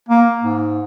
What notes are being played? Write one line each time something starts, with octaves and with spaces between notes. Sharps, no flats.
A#3
G#2